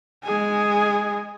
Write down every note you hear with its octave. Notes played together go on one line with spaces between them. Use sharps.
G#3 G#4